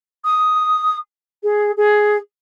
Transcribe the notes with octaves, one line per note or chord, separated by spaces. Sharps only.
D#6
G#4
G#4